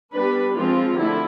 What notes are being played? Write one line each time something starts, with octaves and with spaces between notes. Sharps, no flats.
G3 B3 D4 B4
F3 G#3 C4 F4
D3 F3 A3 E4